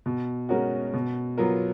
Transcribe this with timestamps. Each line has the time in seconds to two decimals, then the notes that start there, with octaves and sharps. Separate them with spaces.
0.06 B2
0.49 G#3 C#4 F#4 A#4
0.93 B2
1.38 F#3 B3 F4 A#4